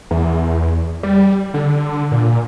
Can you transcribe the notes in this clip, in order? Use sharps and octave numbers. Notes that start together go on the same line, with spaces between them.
E2
G3
D3
A#2